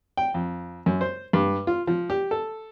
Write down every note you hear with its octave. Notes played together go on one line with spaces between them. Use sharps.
G5
F2
F#2
C5
G2
F4
F3
G4
A4